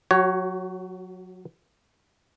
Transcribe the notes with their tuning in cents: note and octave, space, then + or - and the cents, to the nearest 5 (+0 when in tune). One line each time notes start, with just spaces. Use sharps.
F#3 -20 F#4 +30 C#5 +0